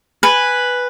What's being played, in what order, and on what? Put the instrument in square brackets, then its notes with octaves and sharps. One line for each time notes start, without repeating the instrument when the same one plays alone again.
[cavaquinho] B4 G#5